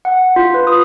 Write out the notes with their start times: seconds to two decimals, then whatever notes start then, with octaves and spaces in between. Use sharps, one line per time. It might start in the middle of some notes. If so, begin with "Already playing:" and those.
0.05 F#5
0.36 F4
0.54 B4
0.67 D#6